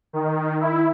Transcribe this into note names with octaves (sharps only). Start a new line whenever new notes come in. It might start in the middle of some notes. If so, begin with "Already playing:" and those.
D#3
E4